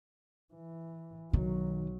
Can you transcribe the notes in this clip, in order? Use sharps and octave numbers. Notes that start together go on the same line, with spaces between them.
E3
B1 D#3 F#3